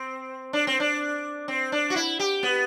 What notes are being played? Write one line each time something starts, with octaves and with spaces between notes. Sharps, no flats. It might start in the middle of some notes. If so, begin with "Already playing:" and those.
Already playing: C4
D4
C4
D4
C4
D4
F#4
E4
G4
B3